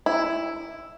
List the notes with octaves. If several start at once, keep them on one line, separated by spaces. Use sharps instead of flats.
E4